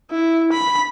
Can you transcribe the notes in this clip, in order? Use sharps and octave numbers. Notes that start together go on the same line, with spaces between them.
E4
B5